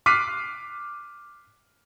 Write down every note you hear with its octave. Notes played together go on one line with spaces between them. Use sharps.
D6 F6 F#6 B6 C7 D#7